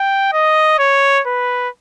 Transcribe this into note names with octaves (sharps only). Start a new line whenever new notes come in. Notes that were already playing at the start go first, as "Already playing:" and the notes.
Already playing: G5
D#5
C#5
B4